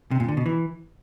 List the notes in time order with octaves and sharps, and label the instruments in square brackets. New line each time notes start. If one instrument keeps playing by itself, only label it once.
[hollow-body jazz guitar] C3
A#2
D3
B2
E3